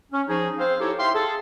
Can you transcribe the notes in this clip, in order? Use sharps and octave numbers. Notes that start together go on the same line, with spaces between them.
C#4
F3 D#4 G#4
C4 C5 F5
D#4 E4 G4 A4 C5 C#5
E5 F5 G5 C6
G#4 A4